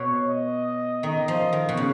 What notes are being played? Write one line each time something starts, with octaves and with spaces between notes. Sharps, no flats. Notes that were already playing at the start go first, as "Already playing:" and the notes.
Already playing: B2 C#5
D#5
D#3 D#5
F3
D#3
B2
C#3